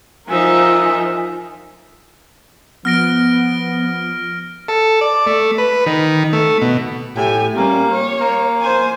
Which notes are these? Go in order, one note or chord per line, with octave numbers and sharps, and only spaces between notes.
F3 D#4 A#4 E5 G#5
F3 B3 F6 A#6 D7
A4
D5
A3
B4
D#3
A3
B2
A2 G4 G#5
G3 A#3 C#4
C#5
A#3
C5 G#5